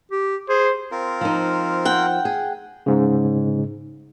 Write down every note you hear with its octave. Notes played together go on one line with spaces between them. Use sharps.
G4
G#4 C5
C4 F4 A#4
F3 D#4
F#5 G5
G#4
G#2 C#3